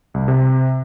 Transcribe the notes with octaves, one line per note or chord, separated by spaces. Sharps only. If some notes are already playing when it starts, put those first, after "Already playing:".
C2
C3